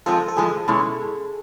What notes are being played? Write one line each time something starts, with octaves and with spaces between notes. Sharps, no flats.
F3 G#3 C4 F4 A4
A4
A2 F3 G#3 G#4
B2 G#3 C#4 E4